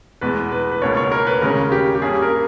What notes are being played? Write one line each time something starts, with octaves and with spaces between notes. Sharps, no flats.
E2 B2 G#3 B3 B4
B4
B4
C#2 B2 A#3 C#5
C#5
A#4
B4
D#2 C#3 G#3 C#4 A#4
G4
G4
G2 G3 A#3 C#4 G#4
A#4